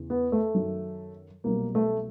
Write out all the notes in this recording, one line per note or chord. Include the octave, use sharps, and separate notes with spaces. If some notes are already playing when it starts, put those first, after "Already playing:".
Already playing: E2 C#3 E3
B3
A3
F#2 D#3 F#3
C2 B2 F#3 A#3
A3